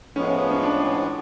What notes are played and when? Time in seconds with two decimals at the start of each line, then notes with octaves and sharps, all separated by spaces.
0.15 A2 F3 G#3 B3 C#4
0.51 C#4
0.63 D4